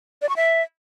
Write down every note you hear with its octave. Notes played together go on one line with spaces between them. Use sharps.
D5
C#6
E5